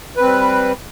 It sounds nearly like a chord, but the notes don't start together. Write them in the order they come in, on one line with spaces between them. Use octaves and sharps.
B4 C4 G3